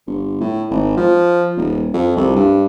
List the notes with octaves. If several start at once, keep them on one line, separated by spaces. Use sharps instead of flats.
G1
A2
G#1
F3
D#1
F2
C2
G2